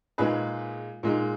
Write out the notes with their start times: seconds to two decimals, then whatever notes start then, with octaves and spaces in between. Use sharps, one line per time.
0.18 A#2 G#3 D#4 G#4 B4
1.03 A#2 G#3 D#4